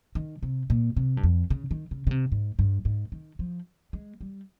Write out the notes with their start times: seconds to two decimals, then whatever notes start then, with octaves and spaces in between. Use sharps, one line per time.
0.15 D#3
0.43 C3
0.70 A#2
0.96 C3
1.17 G2
1.23 F2
1.50 C#3
1.71 D#3
1.91 C#3
2.07 C#3
2.11 C3
2.32 G#2
2.59 G2
2.85 G#2
3.12 D#3
3.39 F3
3.93 G#3
4.21 G3